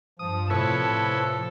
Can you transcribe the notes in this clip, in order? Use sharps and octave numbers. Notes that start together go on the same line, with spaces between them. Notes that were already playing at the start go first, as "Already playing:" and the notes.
G2 F3 D#6
A2 C3 E4 A4 B4 C#5